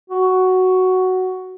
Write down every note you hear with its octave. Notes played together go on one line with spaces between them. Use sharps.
F#4